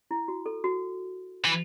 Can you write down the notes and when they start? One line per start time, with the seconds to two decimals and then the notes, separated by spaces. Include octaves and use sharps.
0.11 E4
0.28 F#4
0.46 A4
0.64 F#4
1.45 E3